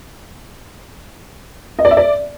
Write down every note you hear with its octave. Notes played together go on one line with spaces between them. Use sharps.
D#5
D5
E5
D5